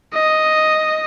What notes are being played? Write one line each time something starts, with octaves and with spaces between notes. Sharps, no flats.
D#5